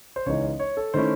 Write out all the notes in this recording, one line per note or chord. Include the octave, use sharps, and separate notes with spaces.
C5
C#2 C#3 E3 G#3 D#4 C#5
D#5
C#5
A4
D#3 A3 C#4 E4 C5